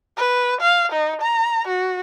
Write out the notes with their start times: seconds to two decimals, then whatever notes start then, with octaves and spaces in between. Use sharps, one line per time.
0.17 B4
0.61 F5
0.92 D#4
1.22 A#5
1.68 F#4